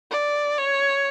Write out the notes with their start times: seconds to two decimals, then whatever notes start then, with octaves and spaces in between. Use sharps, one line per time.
0.11 D5
0.58 C#5